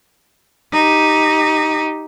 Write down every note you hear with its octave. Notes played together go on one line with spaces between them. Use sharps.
D#4 G4